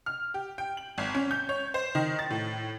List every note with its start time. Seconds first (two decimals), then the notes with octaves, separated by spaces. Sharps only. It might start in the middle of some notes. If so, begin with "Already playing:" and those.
0.06 F6
0.34 G4
0.58 G5
0.77 F#7
0.98 G#1
1.15 C#4
1.31 G6
1.49 C#5
1.74 C5
1.95 D#3
2.19 A6
2.30 A2